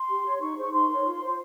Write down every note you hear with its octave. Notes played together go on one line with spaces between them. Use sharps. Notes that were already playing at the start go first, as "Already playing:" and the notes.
Already playing: C6
G4
C#5
D#4 C#6
G#4 C5
C#6
D#4 C6
A#4 C#5
F4
C5